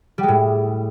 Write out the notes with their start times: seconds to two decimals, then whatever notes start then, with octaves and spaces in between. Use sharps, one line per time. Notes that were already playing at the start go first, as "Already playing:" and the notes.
0.18 G3
0.23 G#3
0.28 A2